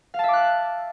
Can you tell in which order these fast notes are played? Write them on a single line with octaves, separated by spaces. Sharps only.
F5 A5 E5 D6 F#6